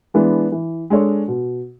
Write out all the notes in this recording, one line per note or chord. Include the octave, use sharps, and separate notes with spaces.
E3 G#3 B3 D4
E3
G#3 D4 A4 C#5
B2